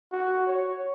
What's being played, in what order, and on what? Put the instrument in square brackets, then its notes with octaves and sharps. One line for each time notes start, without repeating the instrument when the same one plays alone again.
[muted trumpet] F#4
C#5